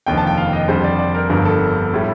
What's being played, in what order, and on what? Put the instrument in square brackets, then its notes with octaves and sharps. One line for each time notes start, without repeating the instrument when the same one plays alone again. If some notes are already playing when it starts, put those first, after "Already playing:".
[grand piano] F1 D#2 D3 F3 G5
A5
G5
F5
D#5
F2 D3 G3 C5
D5
D5
A#4
G1 G2 D3 F3 A#4
A4
A2 G3